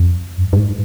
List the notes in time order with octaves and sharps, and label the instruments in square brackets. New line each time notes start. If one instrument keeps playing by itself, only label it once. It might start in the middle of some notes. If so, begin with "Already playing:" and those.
Already playing: [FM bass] F2
G2
G2
G#2